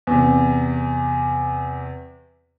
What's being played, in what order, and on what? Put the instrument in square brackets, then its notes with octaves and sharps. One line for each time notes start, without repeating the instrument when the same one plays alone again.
[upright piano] E2 C3